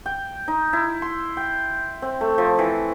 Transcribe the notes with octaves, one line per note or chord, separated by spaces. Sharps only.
G5
D#4
E4
C6
G5
C4
A3
F3
E3